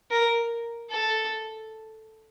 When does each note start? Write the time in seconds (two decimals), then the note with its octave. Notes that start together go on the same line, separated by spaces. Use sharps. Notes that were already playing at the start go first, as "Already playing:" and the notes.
0.11 A#4
0.91 A4